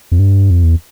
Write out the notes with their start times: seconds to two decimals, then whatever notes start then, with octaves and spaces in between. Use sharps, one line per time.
0.12 F2
0.19 G2
0.50 F2
0.63 E2